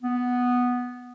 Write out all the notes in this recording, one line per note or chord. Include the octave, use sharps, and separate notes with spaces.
B3